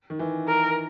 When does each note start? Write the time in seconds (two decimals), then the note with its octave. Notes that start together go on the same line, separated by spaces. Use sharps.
0.10 D#3
0.19 E3
0.48 A#4